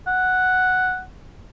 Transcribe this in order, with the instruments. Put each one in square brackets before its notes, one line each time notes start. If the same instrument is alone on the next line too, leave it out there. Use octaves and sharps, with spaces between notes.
[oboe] F#5